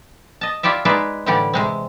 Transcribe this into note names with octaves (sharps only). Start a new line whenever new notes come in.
D#5 A5
E4 F4 G4 D5 E5
G#3 D#4 G#4 B4 D5 E5
A2 D3 E3 G3 G4 D5
C3 G#3 C4